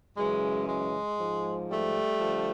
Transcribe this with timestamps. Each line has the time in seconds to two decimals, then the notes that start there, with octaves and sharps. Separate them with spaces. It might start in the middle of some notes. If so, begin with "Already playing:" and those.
0.16 F#2 C#3 E3 G#3
0.67 G#3
1.19 G#2 F3
1.70 G3 A3
2.21 D3 F3